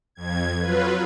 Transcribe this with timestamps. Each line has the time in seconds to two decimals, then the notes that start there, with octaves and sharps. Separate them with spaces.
0.15 F2 G#6
0.60 F#3 F4 B4